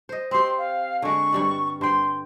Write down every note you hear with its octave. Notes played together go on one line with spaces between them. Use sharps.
C5 D#5
C4 G4 C6
F5
D3 G#3 C#6
G2 G3 D5
G2 G5 C6